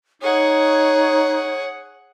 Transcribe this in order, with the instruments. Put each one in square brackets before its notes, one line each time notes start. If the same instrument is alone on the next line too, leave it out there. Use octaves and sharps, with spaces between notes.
[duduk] D#4 [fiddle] G#4 F#5 [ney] C#5